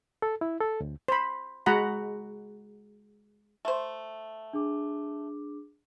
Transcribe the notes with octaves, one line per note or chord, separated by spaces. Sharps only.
A4
E4
A4
D2
C5 B5
G#3 F#4 F#5 A#5 B5
A3 C5
D4 G#4 D6